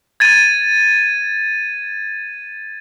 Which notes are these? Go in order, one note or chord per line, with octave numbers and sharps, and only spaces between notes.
G#6 A6 D#7